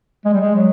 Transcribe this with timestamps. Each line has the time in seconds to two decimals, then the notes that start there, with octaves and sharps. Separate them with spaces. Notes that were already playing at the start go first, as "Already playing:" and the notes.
0.25 G#3
0.33 G3
0.40 G#3
0.55 F#3